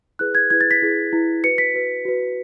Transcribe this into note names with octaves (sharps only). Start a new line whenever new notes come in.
E4 G#4 B4 F#6
G#6
E4 G#4 B4 G#6
A6
B6
E4 G#4 B4
E4 G#4 B4
F#4 B4 C#7
B6
F#4 B4
F#4 B4